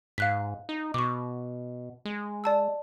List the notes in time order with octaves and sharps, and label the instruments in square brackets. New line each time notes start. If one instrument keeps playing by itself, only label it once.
[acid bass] G#2 [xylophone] F5 F#6 B6
[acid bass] D#4
[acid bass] B2 [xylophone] C#6 D6
[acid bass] G#3
[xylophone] D5 A5 E6